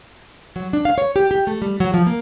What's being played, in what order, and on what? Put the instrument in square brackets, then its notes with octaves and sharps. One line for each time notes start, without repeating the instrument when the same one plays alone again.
[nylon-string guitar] F#3
D4
F5
C#5
G4
G4
A3
G3
F#3
F3
A#3